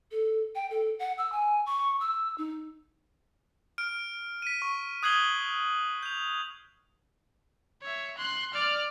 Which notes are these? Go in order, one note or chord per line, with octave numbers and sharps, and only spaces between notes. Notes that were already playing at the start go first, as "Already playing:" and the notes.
A4
G5
A4
F#5
E6
G#5
C#6
E6
D#4
F6 D7
B6 D#7
C#6
D#6 F#6 G#6 C7 F#7 G7
G6 F7
C#5 E5
C6 F#6
D5 F6